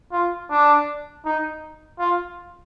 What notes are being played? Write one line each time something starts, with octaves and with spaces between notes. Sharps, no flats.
F4
D4
D#4
F4